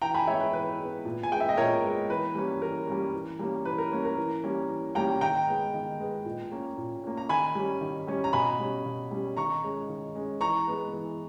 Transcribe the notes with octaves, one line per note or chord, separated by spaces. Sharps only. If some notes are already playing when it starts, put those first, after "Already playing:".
E3 G5 A#5
G#5 B5
G#3 B3 C#5 E5
B4
E3 B4
G#3 B3
A#2
G#5
G#3 B3 G5
E5
D#5
A#2 A#4 C#5
G#3 B3
E3 B4
G3 A#3 C#4
E3 A#4
G3 A#3 C#4
E3
G3 A#3 C#4
E3 B4
A#4
G3 A#3 C#4
A#4
E3
G3 A#3 C#4
E3
G3 A#3 C#4 G5 A#5
D#3 G5 A#5
G#3 B3
D#3
G#3 B3
A#2
A#3 C#4
A#2
A#3 C#4
A#5
D#3 G#5 B5
G3 C#4
D#3
G3 C#4
A#5
B2 G#5 B5
G3 C#4
B2
G3 C#4
D#3 A#5 C#6
G#3 C#4
D#3
G#3 C#4
E3 A#5 C#6
G#3 B3
E3